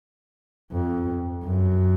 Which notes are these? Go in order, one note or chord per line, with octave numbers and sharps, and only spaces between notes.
F2
F#2